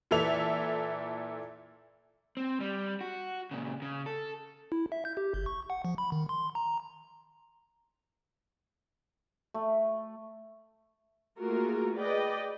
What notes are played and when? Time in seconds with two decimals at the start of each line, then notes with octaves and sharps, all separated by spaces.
0.11 A#2 E3 A4 E5 F7
2.37 C4
2.60 G3
3.01 F#4
3.51 A#2 C#3
3.82 C#3
4.06 A4
4.72 E4
4.92 E5
5.05 G6
5.17 G4
5.34 G1
5.46 C#6
5.70 F#5
5.85 F3
5.98 B5
6.12 D#3
6.29 C6
6.55 A#5
9.54 A3
11.39 A3 A#3 F4 F#4 G#4 A#4
11.96 G#4 B4 D5 D#5 G5